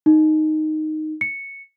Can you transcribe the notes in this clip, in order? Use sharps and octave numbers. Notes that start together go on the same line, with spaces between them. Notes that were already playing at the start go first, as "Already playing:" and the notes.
D#4
C#7